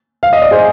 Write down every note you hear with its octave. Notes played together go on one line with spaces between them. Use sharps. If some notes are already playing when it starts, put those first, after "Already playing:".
F5
D#5
D5
G#4 C5